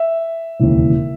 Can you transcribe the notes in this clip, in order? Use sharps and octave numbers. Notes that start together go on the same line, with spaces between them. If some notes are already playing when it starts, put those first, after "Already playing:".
Already playing: E5
E1 D#2 C#3 E3